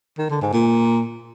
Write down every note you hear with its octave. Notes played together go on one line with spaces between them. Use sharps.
D#3
D3
G#2
A#2